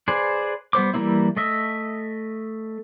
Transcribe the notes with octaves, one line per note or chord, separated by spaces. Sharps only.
G#4 B4 C5 D5
G3 B3 C5 D6
E3 G3 A#3 C4 E4
A3 D#5 E5